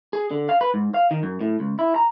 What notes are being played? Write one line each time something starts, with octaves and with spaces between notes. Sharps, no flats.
G#4
D3
F5
B4
G#2
F5
D#3
F#2
A2
C#2
E4
A#5